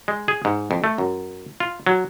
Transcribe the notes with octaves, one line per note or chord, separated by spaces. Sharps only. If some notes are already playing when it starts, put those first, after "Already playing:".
G#3
G#4
G#2
F2
A3
F#2
F4
F#3